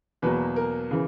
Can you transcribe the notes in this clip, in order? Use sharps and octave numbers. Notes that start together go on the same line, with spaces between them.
E2 B2 F#3 A#3 B4
A#4
C#3 E3